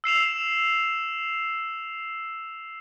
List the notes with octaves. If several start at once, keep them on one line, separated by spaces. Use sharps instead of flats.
E6 C7 E7 F7